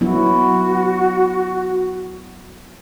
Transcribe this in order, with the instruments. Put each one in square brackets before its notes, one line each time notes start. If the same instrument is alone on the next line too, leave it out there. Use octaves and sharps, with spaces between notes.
[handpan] F#3 B3 E4 [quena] F#4